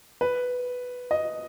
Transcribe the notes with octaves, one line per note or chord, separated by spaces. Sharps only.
B4
D#5